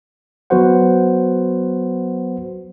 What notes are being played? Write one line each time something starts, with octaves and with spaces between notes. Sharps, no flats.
F#3 B3 F#4 B4 C5 F#5